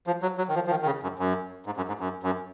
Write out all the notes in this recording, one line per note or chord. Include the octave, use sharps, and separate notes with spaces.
F3
F#3
F#3
D#3
F3
F3
D#3
D#3
C#3
F#2
F#2
G#2
F#2
G#2
F#2
F#2